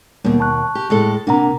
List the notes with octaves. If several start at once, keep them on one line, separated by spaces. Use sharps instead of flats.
D#2 B2 G3 A#3 B3
A5 C#6 F#6
G4
A2 G#3 A4
C3 A#3 D4 F#5 A#5